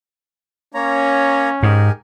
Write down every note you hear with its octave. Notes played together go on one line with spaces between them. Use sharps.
A#3 C#4 C#5 A#5
G#2 G4 A#4 G#5